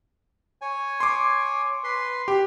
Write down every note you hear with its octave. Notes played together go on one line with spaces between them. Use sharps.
C#5 G#5
C6 D6
B4 C6
G4